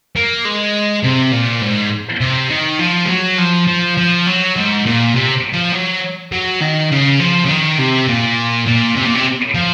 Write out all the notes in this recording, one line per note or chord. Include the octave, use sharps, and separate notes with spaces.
A#3
G#3
C3
A#2
G#2
C3
D#3
F3
G#3
F#3
F3
F3
F3
F#3
G#2
A#2
C3
F3
F#3
F#3
D#3
C#3
F3
C#3
D#3
C3
A#2
A#2
C3
A#2
C3
F3